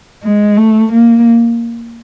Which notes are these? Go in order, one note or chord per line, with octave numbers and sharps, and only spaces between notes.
G#3
A3
A#3